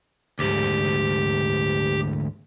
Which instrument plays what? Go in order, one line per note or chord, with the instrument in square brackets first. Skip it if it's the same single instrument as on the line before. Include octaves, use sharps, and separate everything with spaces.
[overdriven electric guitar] D2 G#2 [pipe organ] G4